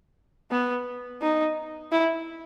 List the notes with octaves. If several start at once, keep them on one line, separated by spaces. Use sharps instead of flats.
B3
D#4
E4